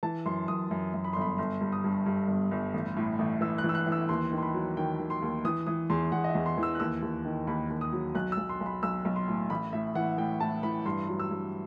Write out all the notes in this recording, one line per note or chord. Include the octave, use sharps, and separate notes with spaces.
E3 A5
F#2 C6
F#2 D#6
F#2
F#2
B5
G1 C6
B5
G1 C6
G2
D#6
G2
G2
G1
G1
A1
A2
A1
E3 E6
F#6
E3
E6
F#6
E3
E6
D#2 C6
D#3
C6
B5
F#3
D#3 G5
D#3
C6
D#2
E3 D#6
E3 D#6
E2 C6
E2 F#5
D#5
E5
E2
C6
E3
E6
F#6
D#2 E6
D#2
D#3
D#2 B5
D#2
D#6
F#3
B1 F#6
E6
B1
C6
B1
B5
B1 E6
B1
C6
A2
A1 B5
A2 E5
E3 F#5
A2 G5
A2 A5
E3 B5
G2 C6
F#3
E6
G2